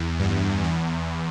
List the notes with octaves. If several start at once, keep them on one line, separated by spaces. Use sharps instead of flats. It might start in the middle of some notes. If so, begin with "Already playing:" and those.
Already playing: E2
G2
E2